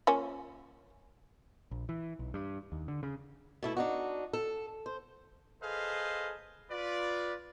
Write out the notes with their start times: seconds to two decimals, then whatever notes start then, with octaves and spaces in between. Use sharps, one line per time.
0.07 F3 A#3 C#4
1.71 A#1
1.89 E3
2.19 B1
2.34 G2
2.72 D#2
2.88 D3
3.03 C#3
3.63 B2 A3 E4
3.77 D4 D#4 F#4
4.33 A4
4.86 C5
5.62 G#4 A4 B4 C5 D#5 F5
6.70 F4 B4 D5